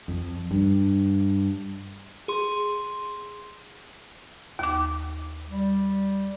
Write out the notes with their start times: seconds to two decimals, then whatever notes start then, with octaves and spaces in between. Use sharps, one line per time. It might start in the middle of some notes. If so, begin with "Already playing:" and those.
0.08 F2
0.51 G2
2.28 G#4 C6
4.59 D#2 D6
5.48 G3